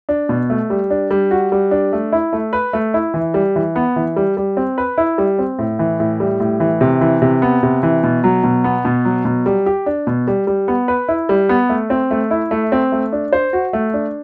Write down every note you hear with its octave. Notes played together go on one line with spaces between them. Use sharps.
D4
B2
A3
G3
D4
G3
F#4
G3
D4
A3
E4
A3
B4
A3
E4
E3
G3
E3
B3
E3
G3
G3
C4
B4
E4
G3
C4
A2
E3
A2
G3
A2
E3
C3
E3
C3
B3
C3
E3
B2
F#3
B2
B3
B2
F#3
B2
G3
G4
D4
B2
G3
G3
B3
B4
E4
G3
B3
A3
C4
A3
E4
A3
C4
A3
D4
C5
F#4
A3
D4